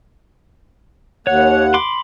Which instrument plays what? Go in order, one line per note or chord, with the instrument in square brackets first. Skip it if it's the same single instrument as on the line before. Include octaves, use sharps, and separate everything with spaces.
[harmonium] D#2 F#5 [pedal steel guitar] C#5
[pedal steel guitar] B5 C6 D6